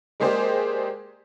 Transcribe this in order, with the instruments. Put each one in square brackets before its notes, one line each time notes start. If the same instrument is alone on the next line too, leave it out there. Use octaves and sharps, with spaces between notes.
[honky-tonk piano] G#3 A#3 G4 G#4 C5 D5